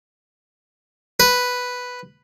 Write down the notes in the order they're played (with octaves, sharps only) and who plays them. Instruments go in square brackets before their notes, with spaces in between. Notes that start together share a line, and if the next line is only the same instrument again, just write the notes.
[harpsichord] B4